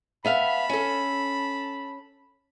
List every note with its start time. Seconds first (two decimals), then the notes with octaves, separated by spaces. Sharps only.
0.25 B3 E5 F5 A5 B5
0.69 C#4 A4